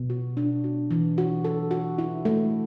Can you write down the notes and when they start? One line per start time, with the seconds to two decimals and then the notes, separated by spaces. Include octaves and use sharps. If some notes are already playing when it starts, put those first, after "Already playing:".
Already playing: B2
0.10 F#4
0.37 D4
0.64 F#4
0.91 E3
1.18 F#4
1.44 A4
1.71 F#4
1.98 E4
2.25 A3